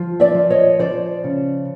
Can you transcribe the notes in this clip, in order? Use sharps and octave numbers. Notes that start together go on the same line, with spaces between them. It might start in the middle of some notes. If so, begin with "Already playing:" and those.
Already playing: F3
D5 E5
F3
C#5 D#5
F3 C5 D5
C#3